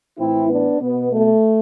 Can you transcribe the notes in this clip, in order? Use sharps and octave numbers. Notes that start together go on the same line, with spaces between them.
A2 E3 C4 E4
B3 D4
B2 B3
A3